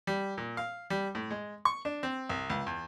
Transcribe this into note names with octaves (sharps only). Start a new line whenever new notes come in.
G3
A#2
F5
G3
A2
G#3
C#6
D4
C4
C2
C#2
E2